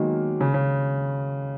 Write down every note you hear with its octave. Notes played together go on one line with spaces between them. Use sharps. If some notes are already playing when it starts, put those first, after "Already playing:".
Already playing: D#3 F#3 G#3 A#3 B3
C#3
C#3